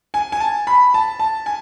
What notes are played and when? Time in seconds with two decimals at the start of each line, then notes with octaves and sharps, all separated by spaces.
0.14 G#5
0.32 G#5
0.40 A5
0.67 B5
0.94 A5
1.19 A5
1.46 G#5